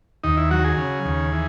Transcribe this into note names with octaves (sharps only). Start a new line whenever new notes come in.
D#2 D#4
E4
F#3 F#4
G#4
C#3
D#2
E3